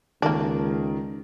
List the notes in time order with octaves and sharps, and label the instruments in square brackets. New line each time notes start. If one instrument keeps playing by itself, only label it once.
[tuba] C#2 [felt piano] D#3 A#4 [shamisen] A#3 D4